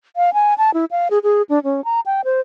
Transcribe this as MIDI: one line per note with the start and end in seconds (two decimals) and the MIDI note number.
0.16 0.34 77
0.34 0.54 80
0.58 0.73 81
0.74 0.85 64
0.91 1.08 77
1.11 1.19 68
1.24 1.42 68
1.49 1.63 62
1.64 1.84 61
1.85 2.00 82
2.06 2.21 79
2.25 2.41 72